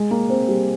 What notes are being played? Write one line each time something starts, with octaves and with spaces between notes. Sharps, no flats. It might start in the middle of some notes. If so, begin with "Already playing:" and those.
Already playing: G#3
A#3
C4
G3